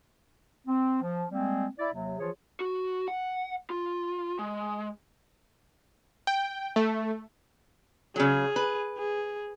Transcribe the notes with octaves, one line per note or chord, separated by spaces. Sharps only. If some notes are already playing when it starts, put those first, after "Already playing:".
C4
F3
G3 G#3 A#3 C4
E4 D5
D#2 C3 F#3
E3 F3 F4 G#4 C#5
F#4
F#5
F4
G#3
G5
A3
C#3 F#3 G#4
B4
G#4